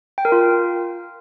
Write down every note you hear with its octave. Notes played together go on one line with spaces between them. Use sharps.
G5
A#4
F4